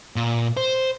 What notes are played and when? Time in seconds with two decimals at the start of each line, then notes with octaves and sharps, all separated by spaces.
0.16 A#2
0.57 C5